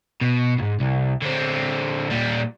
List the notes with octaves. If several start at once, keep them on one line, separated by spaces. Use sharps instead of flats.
B2
C#2 G#2
C2
D3 C4
A#2 G3